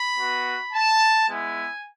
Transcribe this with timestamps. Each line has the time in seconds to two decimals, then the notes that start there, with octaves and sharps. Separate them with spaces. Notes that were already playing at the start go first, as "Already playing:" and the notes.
Already playing: B5
0.18 B3 F#4
0.73 A5
1.29 G#3 B3 E4 G#5